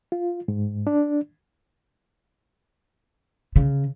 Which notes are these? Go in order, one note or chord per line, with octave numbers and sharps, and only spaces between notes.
F4
G#2
D4
C#3